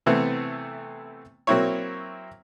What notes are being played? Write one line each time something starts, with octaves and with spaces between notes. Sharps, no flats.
C3 E3 A3 B3 C4
F#3 A#3 C4 E4 C#5